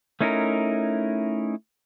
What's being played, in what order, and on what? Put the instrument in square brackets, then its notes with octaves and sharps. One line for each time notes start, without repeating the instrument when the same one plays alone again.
[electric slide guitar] A3 C#4 D#4 E4 A#4